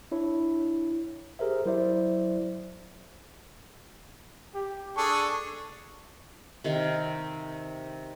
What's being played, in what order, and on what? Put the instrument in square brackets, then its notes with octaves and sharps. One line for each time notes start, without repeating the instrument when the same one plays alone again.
[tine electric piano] D4 E4 C#5
G4 G#4 A#4 C5 E5
F#3 E4 C5 D5 E5
[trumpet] G4
[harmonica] D4 G#4 A4 [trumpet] C#6
[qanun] C3 D#3 F5 G5